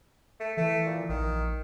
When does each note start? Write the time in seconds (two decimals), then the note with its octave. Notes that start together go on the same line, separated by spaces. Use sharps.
0.40 A3
0.57 E3 A3
0.86 A#2
1.09 A#1 D#3